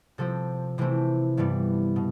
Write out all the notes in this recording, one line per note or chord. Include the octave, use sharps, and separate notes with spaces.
C3 F3 C4 A4
C3 E3 A3 C4
G2 E3 G3 B3
B2